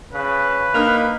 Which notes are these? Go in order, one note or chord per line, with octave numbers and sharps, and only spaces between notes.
C#3 B4
A#3 D4 D#4 F6 F7